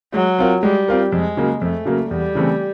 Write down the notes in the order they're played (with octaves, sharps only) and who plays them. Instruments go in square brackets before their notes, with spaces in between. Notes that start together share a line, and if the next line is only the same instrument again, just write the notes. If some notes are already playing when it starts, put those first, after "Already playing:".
[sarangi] F#3 [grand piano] G#3
[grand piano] C4 F4 A#4
[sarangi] G3 [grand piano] G#3
[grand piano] C4 F4 A#4
[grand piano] F2 [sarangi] G#3
[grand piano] C#3 F#3 A#3
[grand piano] F2 [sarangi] A3
[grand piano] C#3 F#3 A#3
[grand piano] E2 [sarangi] G3
[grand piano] C#3 E3 A3 C4